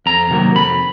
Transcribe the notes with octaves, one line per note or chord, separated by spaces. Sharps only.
F2 A#5
C3 D#3 F#3 A#3
F2 B5